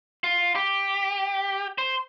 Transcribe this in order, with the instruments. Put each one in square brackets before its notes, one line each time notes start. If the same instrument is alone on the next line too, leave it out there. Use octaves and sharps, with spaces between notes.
[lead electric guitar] F4
G4
C5